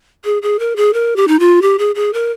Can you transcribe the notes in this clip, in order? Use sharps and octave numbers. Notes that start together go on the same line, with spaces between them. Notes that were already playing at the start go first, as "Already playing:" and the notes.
G#4
G#4
A#4
G#4
A#4
G4
D#4
F4
G4
G#4
G#4
A#4